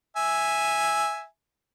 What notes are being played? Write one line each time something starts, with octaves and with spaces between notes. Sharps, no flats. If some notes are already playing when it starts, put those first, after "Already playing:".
E5 G#5